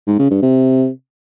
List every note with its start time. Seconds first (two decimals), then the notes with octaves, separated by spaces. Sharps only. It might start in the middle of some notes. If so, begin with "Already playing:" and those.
0.07 G#2
0.19 C#3
0.30 G2
0.42 C3